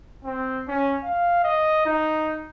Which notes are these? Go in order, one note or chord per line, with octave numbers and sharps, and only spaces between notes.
C4
C#4
F5
D#5
D#4